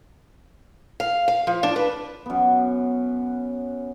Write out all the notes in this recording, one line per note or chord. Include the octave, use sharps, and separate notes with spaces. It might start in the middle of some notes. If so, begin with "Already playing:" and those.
F5
F5
F3
D4
B4
F#2 B3